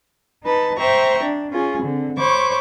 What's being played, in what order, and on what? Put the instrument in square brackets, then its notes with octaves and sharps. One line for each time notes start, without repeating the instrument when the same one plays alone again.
[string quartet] D#4 B4 A5
C5 E5 G5 A#5 C#6
D4
C#4 F4 G#4
D3 C4
C5 C#5 B5 C#6 D6